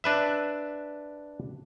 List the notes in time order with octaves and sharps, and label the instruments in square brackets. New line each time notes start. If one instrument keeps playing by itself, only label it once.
[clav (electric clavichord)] D4 B4 E5